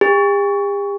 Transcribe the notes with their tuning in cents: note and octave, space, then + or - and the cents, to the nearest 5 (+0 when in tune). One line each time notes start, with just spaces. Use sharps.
G4 +45